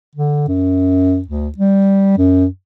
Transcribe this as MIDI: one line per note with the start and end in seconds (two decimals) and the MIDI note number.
0.15 0.44 50
0.48 1.21 42
1.28 1.48 38
1.58 2.14 55
2.18 2.46 42